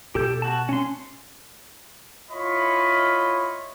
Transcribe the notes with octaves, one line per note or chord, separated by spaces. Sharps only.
B2 G4 A4 G6
F#4 A5
C#4 C6
E4 F4 C#5 D#5 B5 C#6